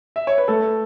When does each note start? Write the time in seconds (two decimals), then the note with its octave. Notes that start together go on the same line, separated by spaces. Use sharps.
0.16 E5
0.27 C#5
0.38 B4
0.48 A3 A4